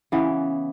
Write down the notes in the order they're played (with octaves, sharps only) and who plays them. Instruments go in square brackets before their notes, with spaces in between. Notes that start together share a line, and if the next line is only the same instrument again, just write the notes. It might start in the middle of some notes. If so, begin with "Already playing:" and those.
[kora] C#3 E3 B3